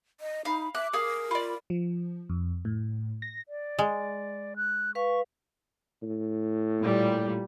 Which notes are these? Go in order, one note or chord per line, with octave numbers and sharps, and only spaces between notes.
D#5
D#4 F5 B5
E5 D6 F#6
G#4 A#4 F5
F4 D5 B5
F3
F2
A2
A#6
D5
G#3
F#6
B4 F5 C#6
A2
A#2 G3